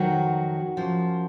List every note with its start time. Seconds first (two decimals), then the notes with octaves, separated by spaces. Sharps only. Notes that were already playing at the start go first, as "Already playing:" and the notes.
Already playing: F2 D#3 F#3 F#4
0.77 F#2 F3